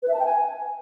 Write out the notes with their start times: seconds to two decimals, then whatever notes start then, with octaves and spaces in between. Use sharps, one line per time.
0.02 B4
0.08 E5
0.14 A5
0.19 G5
0.25 G#5